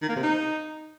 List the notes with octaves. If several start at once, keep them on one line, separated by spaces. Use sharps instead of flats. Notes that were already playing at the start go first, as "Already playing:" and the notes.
D#3
A#3
C3
D#4